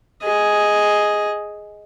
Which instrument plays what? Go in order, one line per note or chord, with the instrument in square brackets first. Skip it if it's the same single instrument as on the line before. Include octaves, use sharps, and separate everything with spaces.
[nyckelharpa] G#4 D#5